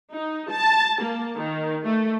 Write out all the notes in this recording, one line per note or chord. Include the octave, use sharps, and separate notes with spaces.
D#4
A5
A#3
D#3
A3